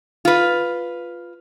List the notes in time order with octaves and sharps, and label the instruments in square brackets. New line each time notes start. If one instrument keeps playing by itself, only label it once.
[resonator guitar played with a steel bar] F4 B4